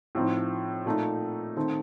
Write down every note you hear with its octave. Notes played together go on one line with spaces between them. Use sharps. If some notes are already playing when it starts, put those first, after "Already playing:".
A2 F3 C4 D#4
A#2 A3 D#4
D#3 A3 C4